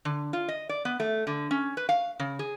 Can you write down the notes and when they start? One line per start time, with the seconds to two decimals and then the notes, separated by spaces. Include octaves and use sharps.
0.05 D3
0.33 F4
0.48 D#5
0.69 D5
0.85 B3
1.00 A3
1.27 D3
1.51 C#4
1.77 B4
1.89 F5
2.20 C#3
2.39 G#4